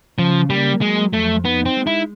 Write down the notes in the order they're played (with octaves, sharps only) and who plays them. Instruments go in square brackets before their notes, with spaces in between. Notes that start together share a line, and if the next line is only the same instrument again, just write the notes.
[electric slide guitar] C#3 [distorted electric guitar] F3
[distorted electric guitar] G3 [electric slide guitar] A#3
[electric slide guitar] F#3 [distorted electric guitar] G#3
[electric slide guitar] F2 [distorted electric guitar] A3
[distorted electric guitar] B3 [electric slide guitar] D#4
[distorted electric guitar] C4
[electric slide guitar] G#3
[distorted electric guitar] E4